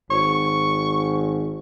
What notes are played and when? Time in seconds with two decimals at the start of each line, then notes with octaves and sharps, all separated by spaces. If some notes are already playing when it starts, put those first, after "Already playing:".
0.11 G#1 C#6